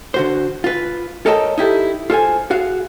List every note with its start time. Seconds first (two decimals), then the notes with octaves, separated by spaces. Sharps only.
0.14 D3 F#4 C5
0.64 F4 B4
1.26 A4 A#4 C#5 D#5 G5 A5
1.58 D#4 E4 G4 A4
2.10 F4 A4 C5 G#5
2.51 F#4 G#4 F5